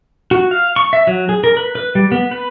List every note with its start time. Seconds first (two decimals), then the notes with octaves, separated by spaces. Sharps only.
0.31 F#4
0.51 F5
0.76 C#6
0.93 E5
1.07 F#3
1.29 G#4
1.44 A#4
1.57 B4
1.75 B4
1.95 G3
2.12 B3
2.31 B4